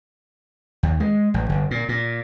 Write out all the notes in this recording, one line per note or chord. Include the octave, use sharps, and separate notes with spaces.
D#2
G#3
A1
G1
A#2
A#2